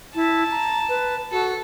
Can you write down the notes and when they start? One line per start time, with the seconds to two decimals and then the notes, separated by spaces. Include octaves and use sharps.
0.15 E4 A5
0.51 A#5
0.89 B4
1.32 F#4 A4